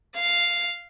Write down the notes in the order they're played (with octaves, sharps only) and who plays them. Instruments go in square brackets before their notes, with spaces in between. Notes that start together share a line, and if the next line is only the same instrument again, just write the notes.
[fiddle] F5